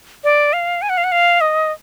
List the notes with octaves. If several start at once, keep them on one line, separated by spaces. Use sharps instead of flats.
D5
F5
G#5
F#5
F5
F#5
F5
D#5